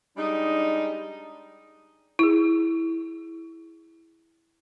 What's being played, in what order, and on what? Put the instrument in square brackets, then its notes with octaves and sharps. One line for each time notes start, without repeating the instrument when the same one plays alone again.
[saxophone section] G3 G#3 D4 D#4
[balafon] E4 G#4